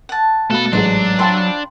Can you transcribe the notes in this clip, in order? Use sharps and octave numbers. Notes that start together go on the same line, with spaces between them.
F#5 A5
B2 A3 A4 F5 B5 F#6
A1 G#2 F#3 D4 G#4 C5
F4 A4 C5 G5 B5 C6